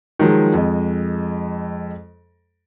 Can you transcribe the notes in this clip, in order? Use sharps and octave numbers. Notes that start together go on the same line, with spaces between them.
D#3 F3 F#3 G#3
F2 G#3 D#5